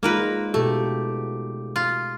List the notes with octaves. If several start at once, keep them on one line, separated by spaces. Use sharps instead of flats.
G#3 A#3 D#4 F4 A#4 B4
B2 A3 G4
F4